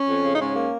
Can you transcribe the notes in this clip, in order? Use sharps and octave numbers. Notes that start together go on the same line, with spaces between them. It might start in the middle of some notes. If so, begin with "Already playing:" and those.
Already playing: C#4
F2
C#3
D#4
G#2 C#4
A#3